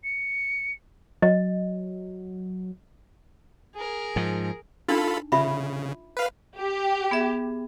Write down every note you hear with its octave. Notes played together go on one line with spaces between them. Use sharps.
C#7
F#3 D#5
G#4 A#4
G#2 F3
D4 D#4 F4 A4 B5
C#3 F4 E5 B5
B4 F5
G4
B3 G#4 E5